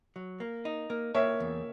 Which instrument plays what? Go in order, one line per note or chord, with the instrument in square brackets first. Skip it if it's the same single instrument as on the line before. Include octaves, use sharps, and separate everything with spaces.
[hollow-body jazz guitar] F#3
A#3
D#4
A#3
[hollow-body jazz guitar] A#3 [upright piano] C#5 E5
[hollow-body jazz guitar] E2